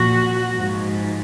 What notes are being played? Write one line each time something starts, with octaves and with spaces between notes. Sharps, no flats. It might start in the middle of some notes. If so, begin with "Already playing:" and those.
Already playing: A#2 F3 F#4
G#2 F3